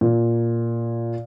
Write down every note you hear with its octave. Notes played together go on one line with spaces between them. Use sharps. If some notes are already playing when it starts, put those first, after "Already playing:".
A#2